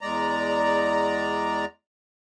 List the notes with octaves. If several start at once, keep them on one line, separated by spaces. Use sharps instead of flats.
E2 G#3 D5 A#5